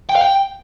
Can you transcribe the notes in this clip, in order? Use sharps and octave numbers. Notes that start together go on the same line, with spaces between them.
G5
F5
G5